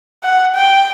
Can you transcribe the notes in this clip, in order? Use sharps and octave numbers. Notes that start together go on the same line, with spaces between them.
F#5
G5